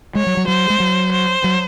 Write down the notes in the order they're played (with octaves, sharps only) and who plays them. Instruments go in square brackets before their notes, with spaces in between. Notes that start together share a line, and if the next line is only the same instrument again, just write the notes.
[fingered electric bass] G#3 [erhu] C#5
[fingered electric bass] F#3
F#3
[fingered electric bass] F#3 [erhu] C5
[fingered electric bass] G#3
F#3
[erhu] C5
[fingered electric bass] F#3